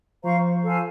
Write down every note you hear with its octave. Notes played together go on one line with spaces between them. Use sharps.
F3 C5 F5 A#5 C#6
A4 C5 F5 G#5